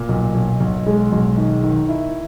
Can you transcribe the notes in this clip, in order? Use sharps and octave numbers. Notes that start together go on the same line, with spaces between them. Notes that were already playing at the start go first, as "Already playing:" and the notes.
Already playing: A#2
B1
B1
B1
G#3
B1
D#3
D#3
E4